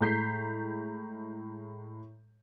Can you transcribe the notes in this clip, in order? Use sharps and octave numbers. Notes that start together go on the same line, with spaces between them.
A2 G#3 A#5 G6 B6 C7